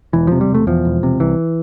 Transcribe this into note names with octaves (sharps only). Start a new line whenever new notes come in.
E1 E3
C3 F3
G3
E1 A3
E2 F3
E1
C3
C2 E3